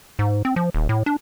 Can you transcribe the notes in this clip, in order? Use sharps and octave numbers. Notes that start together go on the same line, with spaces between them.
G#2
C4
F3
D#1
A2
D4